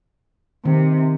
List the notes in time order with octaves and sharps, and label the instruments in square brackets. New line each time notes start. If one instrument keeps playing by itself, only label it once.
[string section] C3 [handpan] D#3